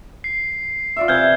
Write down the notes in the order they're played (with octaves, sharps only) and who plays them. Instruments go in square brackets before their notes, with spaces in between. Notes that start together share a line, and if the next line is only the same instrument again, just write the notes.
[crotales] C7
[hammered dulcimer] F4 D5 E5
[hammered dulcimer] C3 E3 [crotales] F6 G6 G#6